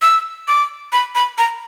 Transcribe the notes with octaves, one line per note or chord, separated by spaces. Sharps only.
E6
D6
B5
B5
A#5